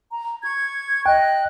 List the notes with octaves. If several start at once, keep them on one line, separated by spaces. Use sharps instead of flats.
A#5
C#6 G#6
D#5 G5 F#6